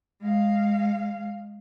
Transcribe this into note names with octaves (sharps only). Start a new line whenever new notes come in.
G#3 F5